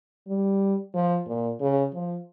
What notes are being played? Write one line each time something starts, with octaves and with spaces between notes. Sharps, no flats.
G3
F3
A#2
C#3
F3